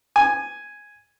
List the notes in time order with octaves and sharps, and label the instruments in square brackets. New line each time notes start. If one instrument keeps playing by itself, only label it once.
[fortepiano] G#5